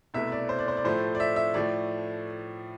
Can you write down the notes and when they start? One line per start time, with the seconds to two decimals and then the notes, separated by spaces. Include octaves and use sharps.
0.14 C2 B2 A3 E5
0.32 D5
0.49 C5
0.59 D5
0.68 C5
0.77 D5
0.84 A2 F3 A3 C5
1.15 D5
1.20 E5
1.36 E5
1.54 A2 F3 A3 D5